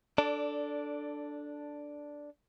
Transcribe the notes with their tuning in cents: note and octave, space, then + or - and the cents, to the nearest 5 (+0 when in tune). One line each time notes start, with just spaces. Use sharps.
D4 +0 A4 +0 D5 -20